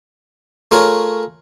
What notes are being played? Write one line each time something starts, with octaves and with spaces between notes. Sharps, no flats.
A3 F4 G#4 A#4 C#5